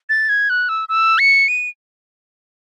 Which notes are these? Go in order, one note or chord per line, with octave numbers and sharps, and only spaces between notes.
A6
G#6
F#6
E6
E6
C#7
D#7